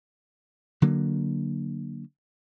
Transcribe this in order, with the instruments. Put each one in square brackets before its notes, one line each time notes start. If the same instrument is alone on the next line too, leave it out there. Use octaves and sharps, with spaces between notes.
[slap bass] D3 F#3 A#3